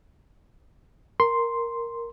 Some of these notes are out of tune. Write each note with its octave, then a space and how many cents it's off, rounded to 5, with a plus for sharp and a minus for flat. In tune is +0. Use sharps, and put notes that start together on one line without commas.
A#4 +0 C6 +0